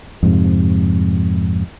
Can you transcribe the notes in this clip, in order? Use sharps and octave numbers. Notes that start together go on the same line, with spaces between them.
F2 G#2 C3